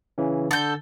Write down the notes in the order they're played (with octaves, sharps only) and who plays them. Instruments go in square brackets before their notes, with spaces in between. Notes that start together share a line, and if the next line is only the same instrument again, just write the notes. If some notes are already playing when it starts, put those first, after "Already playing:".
[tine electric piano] C#3 E3 C#4
[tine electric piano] D3 [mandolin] A4 G6